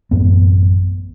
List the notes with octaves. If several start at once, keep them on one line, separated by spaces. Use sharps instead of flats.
A1 F#2 B3